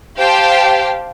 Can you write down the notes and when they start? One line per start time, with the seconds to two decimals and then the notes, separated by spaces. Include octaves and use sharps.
0.19 G4 C5 F5 G5 A5